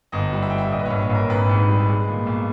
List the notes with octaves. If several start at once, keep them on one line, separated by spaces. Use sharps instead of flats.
G1 D#5
G3
E5
G3 G5
E5
A#1 D#5
B4
A#1 C#5
C#5
A#1 A#4
G#1 B4
G#2
G3
G#3
A#2
B1